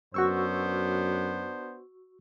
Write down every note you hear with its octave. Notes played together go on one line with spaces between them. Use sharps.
F#2 B3 D4 F#4 C5 C#6 E6